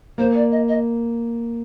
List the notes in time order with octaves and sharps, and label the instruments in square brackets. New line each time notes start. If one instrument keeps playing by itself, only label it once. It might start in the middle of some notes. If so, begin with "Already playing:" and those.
[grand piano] A#3 [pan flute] C5
[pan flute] D5
D#5
D#5